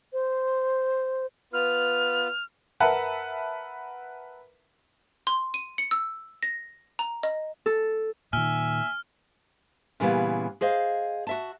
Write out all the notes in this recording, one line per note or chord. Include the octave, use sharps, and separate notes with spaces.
C5
B3 F4 B4 F6
A#4 B4 E5 F#5 A5
C6
D#7
C#7
E6
A#6
A#5
D#5
A4
A#2 D#3 E5 G#5 F6
A#2 C#3 E3 G3 B3
G#4 C5 D#5 F5
F#4 E5 A5